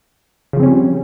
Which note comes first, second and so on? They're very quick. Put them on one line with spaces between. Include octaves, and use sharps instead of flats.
C#3 F3 C4 C#4 G3